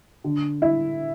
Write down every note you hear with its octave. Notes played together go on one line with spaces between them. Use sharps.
D3
E4